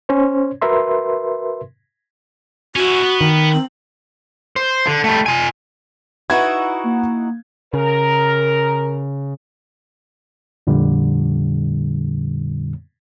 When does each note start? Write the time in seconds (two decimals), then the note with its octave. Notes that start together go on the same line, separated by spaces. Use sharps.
0.09 C#4 C5 C#5
0.62 F#4 A#4 B4 E5 C6
2.76 C#4 E4 F#4
3.03 B3
3.21 D#3
3.53 C4
4.56 C5
4.87 D3
5.04 G3 A3
5.26 F4 G#5
6.30 D#4 E4 F#4 B4 F#5 G#6
6.84 A#3
7.74 C#3 A#4
10.67 F2 A#2 D3 G3